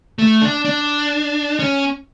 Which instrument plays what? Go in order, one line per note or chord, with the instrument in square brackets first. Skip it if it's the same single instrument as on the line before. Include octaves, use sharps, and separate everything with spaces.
[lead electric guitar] A3
D4
D4
C#4